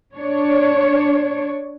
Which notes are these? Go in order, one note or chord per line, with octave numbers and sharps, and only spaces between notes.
D4 C#5